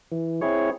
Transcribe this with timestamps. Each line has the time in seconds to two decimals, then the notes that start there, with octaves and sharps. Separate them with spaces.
0.12 E3
0.41 C4 E4 G#4 C#5